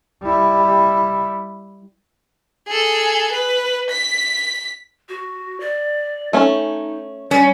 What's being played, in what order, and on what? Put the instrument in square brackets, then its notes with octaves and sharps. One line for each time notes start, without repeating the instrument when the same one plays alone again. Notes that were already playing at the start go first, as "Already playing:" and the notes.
[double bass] G3 E4
[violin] G#4 A4
B4
B6
[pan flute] F#4
D5
[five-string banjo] A3 C#4 [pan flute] D#4
[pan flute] G3 [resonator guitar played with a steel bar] C#4